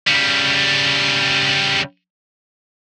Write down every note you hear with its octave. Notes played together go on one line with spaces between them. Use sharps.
C#3 G3